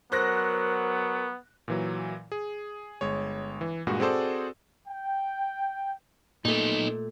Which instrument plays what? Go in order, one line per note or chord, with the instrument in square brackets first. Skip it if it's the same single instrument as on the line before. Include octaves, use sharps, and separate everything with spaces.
[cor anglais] F#3 [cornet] B3 [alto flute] A#4 [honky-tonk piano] C5 F#6 A#6
[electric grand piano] A#2 E3 F#3
G#4
G1 G#3 C#5
E3
G2 A#2 G#3 F#4
C4 F#4 G#4 A4 C5 D5
[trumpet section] G5
[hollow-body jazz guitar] A#2 A3 [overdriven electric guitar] B3 D#4